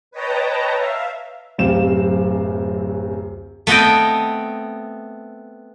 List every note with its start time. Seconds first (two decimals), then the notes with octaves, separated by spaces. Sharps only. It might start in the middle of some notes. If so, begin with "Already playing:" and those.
0.11 B4 C#5 D#5 G5 A5 A#5
0.73 E5 F5
1.58 D1 F#2 C3 C4 F5 E7
3.67 A3 B3 C4 D#5 G5